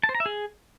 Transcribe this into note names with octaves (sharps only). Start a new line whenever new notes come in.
A5
C5
A#5
E5
G#4